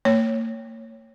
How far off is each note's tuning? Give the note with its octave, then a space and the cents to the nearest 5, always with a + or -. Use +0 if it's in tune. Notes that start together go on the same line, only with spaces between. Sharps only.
A#3 -35 C#5 +0